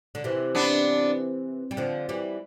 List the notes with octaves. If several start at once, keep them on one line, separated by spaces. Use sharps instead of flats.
D3
C3 E3
B3 D4
G3
D3 F3
E3 G3